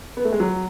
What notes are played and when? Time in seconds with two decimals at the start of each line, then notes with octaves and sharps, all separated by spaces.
0.17 B3
0.25 A3
0.32 G#3
0.40 F#3